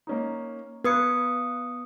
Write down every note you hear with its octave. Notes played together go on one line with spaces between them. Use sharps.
A#3 C#4 D#4
B3 B4 D#6 G#6 C#7